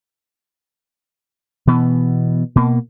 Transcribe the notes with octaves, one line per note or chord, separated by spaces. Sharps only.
B2 E3 B3
B2 A#3